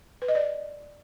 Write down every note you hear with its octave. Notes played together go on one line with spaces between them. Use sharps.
B4
D#5
D5